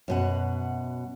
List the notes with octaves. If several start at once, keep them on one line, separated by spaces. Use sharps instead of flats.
F#2 B2 F#5